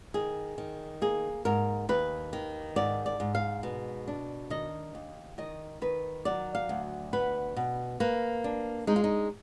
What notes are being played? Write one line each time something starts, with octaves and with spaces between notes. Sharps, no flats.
D#3 G#4
D#3
A#3 G#4
G#2 A#4
D#2 B4
D#3
G#2 D5
D5
G#2
F5
B2
D4
D#3 D#5
D#2
D#3 D#5
D#3 B4
F#3 D5
F5
D2
B3 B4
B2
A#3 B4
D4
G#3 D#4
F4
D#4